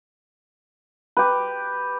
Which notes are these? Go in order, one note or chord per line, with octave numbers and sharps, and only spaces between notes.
G4 B4